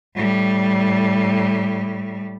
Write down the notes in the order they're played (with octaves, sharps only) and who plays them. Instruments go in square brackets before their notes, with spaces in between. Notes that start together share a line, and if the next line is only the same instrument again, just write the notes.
[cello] A2 G3